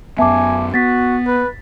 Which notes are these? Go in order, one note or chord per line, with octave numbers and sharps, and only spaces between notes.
F#2 B3 E5 G#5 A5 D6
B3 F#4 A6 B6
B4